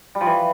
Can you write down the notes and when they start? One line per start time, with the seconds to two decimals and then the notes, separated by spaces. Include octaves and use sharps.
0.15 G3
0.21 F3
0.26 E3